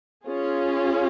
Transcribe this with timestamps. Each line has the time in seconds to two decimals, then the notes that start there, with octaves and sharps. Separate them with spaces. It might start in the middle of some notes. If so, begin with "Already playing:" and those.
0.25 C#4 F4 G#4